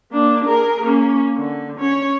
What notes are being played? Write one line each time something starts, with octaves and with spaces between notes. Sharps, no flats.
A#3 D4
G#4 A#4
A#3 C#4
D3
C#4 C#5